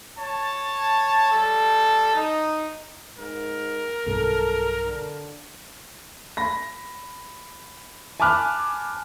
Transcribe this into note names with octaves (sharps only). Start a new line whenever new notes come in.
C#5 A5
G3 A4
D#4
G#2 A#4
B1 G2 A4
D3
B5 A#6
G#5 A5 B5 D6 F6 F#6